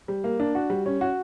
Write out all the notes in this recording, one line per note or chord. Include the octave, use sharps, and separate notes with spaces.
G3
A#3
D4
F#4
G3
C#4
F#4